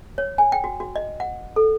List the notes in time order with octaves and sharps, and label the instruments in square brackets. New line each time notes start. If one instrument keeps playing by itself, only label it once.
[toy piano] C#5
G#5
G5
F#4
F#4
D#5
F#5
A4